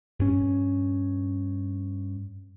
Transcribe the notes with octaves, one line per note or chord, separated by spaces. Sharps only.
G2 C#4